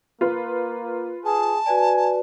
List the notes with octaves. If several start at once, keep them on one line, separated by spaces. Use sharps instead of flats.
A#3 F4 B4
G#4 A5
F#4 B4 D5 G#5